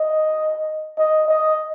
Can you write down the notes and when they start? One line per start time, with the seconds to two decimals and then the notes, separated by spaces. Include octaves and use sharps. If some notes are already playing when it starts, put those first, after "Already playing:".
Already playing: D#5
0.98 D#5
1.28 D#5